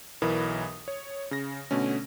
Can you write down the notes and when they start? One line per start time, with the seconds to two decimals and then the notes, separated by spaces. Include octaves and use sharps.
0.22 B1 E3 A#4 B5 D#6
0.88 C#5
1.31 C#3 A#6
1.71 B2 D3 A3 C#4